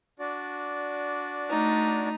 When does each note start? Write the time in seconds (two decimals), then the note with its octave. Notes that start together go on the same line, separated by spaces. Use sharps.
0.19 D4 F#4 D5
1.50 A3 D#4